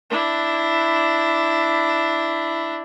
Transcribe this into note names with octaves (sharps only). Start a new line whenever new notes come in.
D4 E4